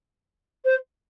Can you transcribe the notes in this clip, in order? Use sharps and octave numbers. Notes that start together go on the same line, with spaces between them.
C5